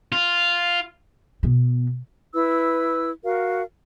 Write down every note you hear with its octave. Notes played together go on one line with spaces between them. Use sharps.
F4
B2 B3
E4 B4 E6
F#4 A#4 F5